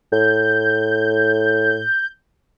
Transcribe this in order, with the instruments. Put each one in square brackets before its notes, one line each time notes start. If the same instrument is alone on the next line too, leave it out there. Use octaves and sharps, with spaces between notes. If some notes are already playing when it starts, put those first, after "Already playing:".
[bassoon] A2 [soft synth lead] G6